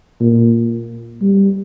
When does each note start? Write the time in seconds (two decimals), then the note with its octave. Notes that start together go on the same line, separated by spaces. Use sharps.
0.21 A#2
1.21 G3